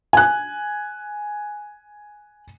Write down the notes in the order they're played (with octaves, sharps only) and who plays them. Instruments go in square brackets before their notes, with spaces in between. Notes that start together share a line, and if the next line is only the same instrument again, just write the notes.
[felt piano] G#5 F#6